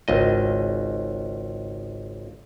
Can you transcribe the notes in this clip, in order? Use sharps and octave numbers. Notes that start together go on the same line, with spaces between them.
G#1 C#2 D#5